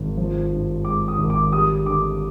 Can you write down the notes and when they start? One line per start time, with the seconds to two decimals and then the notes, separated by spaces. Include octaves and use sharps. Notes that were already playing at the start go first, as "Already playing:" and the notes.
Already playing: G#1
0.17 F3
0.52 G2
0.85 G#3 D6
1.08 D#6
1.18 G#1
1.30 D6
1.52 G3 D#6
1.85 D3 D6